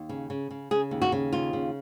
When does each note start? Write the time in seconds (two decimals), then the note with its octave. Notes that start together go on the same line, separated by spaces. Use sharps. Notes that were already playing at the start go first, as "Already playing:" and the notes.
Already playing: D#2
0.09 C#3
0.30 C#3
0.50 C#3
0.71 C#3 G#4
0.91 D#2
1.02 F#4
1.12 C#3
1.33 D#2 F4
1.53 C#3